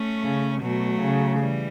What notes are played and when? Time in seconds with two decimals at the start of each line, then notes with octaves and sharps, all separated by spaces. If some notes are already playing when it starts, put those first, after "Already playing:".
Already playing: A3 C#4
0.23 C#3
0.61 B2 F#3 A3
1.01 C#3
1.40 E3 G3